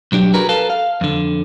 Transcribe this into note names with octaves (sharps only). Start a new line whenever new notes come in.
B1 F#3 D4 G4
F#4 G#4 A#4 B4
A4 B4 F5 A5
F5
F2 D3